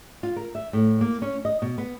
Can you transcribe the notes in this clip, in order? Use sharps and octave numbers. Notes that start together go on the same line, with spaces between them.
F4
A#4
E5
A2
A#3
C#4
D#5
B2
B3